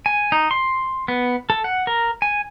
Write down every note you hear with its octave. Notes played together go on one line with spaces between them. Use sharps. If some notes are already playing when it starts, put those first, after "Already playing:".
G#5
D#4
C6
B3
A4
F#5
A#4
G#5